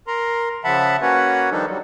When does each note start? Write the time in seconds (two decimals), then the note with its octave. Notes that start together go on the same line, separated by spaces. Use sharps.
0.07 A#4 A#5 C6
0.64 C#3 F3 E5 F#5 A5 B5
1.02 A#3 C#4 F#4 B4 C#5 F#5
1.52 D#3 F3 G3 D4 D#4 A4
1.68 F#3 G3